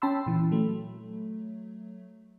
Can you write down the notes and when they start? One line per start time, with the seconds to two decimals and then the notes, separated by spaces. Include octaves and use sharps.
0.02 C#4 G5 A5 B5 C6 E6
0.26 A#2 E3
0.52 F#3 A3